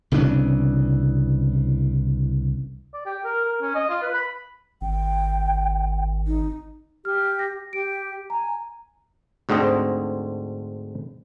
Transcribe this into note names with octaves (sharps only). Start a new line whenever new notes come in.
C2 C#3 E3 D4
D5
G4
A#4
A#4
C#4
D#5
F4
B4
B5
G#1 G5
D#4
G4 F6
A#6
G4 D7
G#5 A#5
D2 G#2 D3 C4 D#5